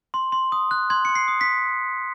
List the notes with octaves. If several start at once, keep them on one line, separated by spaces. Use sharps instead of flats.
C6
C6
D#6
F#6
C6 G#6
C6 C#7
C7
D#6
B6